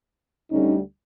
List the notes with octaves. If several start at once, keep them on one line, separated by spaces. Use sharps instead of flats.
D2 D3 G3 C#4 D#4